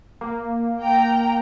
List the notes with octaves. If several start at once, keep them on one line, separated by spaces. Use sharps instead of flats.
A#3
G5 A#5